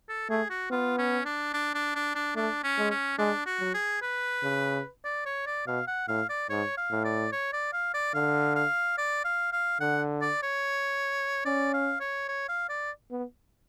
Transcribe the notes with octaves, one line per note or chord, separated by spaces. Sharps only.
A4
A3 G#4
F#4
B3 F4
C#4
D4
D4
D4
D4
D4
A3 D4
C#4
G#3
C#4
G#3 D4
F#4
F#3
G#4
B4
C#3
D5
C#5
D5
B2 F5
F#5
A2 F5
D5
G#2 C#5
F5
A2
D5
C#5
D5
F5
D5
D3 F5
F5
D5
F5
F5
D3 F#5
D5
C#5
C#4 D5
F5
C#5
C#5
F5
D5
B3